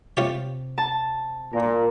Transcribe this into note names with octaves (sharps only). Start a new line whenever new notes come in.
C3 F4 G4 C#5
A5
A#2 A#4